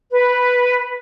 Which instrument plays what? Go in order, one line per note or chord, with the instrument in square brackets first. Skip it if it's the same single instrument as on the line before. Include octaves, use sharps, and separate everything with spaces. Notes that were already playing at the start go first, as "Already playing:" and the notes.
[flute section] B4